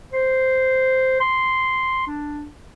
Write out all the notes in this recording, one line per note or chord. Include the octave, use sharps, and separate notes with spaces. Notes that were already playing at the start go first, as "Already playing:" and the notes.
C5
C6
D4